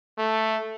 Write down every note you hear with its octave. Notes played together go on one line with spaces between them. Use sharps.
A3